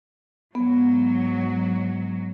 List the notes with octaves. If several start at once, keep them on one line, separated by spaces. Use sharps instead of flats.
G#2 F#3 B3